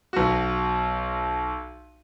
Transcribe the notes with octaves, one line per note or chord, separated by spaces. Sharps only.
B1 F#4